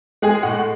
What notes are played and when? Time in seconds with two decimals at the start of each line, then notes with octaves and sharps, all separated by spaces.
0.22 G#3 G#4
0.43 A2 F#5